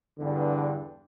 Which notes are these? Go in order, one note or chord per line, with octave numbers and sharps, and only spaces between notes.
E2 G2 D3